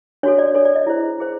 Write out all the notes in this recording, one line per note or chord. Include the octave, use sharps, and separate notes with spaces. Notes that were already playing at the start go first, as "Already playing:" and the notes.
D4 F#4 A4 C#5
D5
D4 F#4 A4 C#5
D5
D#5
E4 G#4 C5
E4 G#4 C5